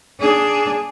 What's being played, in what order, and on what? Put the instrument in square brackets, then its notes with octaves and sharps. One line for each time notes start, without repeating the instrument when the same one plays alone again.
[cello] D4 G#4